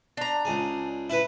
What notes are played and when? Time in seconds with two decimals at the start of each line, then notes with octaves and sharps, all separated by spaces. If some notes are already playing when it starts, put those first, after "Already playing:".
0.17 D4 A#5
0.45 C#2 G#4
1.10 E4 B4